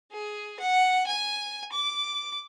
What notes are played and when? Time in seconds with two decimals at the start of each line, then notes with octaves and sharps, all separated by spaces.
0.12 G#4
0.60 F#5
1.06 G#5
1.72 D6